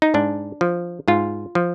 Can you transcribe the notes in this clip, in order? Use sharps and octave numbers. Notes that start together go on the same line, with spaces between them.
D#4
G#2 D4
F3
G#2 F4
F3